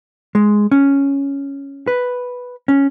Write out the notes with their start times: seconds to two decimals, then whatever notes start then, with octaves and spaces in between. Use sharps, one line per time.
0.35 G#3
0.71 C#4
1.87 B4
2.68 C#4